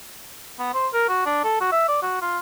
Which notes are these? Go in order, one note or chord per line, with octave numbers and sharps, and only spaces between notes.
B3
C5
A#4
F#4
D4
A4
F#4
E5
D5
F#4
F4